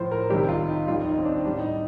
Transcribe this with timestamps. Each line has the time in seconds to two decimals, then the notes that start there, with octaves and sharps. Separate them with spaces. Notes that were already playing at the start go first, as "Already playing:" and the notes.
Already playing: A2 F3 C5
0.12 A#4
0.30 C2 C3 D#3 G3 G4
0.49 F4
0.68 D#4
0.88 D#2 D#3 G3 F4
1.06 D#4
1.18 C4
1.25 D4
1.45 A2 G3 D4
1.60 D#4